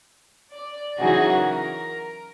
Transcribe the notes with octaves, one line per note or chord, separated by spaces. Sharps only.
D5
C#3 E3 F#3 D#4 F#4 G#4
A#4